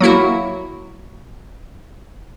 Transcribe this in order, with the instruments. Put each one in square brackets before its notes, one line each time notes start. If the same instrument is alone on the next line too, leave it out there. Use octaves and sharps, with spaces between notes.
[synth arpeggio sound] F#3 A#3 E4 F#4